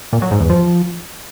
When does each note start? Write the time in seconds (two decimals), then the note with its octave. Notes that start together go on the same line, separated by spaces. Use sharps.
0.13 A#2
0.22 F#3
0.31 G#2
0.40 E2
0.50 F3